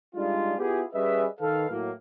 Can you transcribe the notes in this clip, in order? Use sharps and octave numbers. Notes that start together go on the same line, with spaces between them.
G3 G#3 D4 D#4 F4
B3 E4 F4 G4 G#4
G3 C#4 G#4 B4 D#5 E5
D#3 A4 B4 F5
A2 F#3 A#3